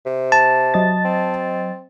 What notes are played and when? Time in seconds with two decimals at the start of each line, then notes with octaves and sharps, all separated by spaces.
0.06 C3
0.32 A5
0.74 F#3 D#5 A6
1.05 C4